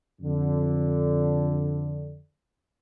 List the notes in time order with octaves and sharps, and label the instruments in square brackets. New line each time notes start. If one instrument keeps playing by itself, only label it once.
[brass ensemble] F2 D3